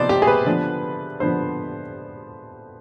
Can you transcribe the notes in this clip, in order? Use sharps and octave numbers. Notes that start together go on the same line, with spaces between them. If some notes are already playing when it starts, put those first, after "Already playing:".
Already playing: C3 F3 B3 D#4 C5 D5
G4
G#4
B4
D3 F3 B3 D4
D3 F3 B3 D4 C5